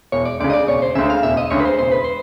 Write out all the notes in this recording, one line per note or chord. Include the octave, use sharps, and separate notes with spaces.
E1 C#5
D5
D2 C#3 D5
D#5
D5
E1 C#5
C5
D2 C#3 E5
F5
E1 E5
D#5
D2 C#3 C#5
B4
C5
E1 C5
B4
C5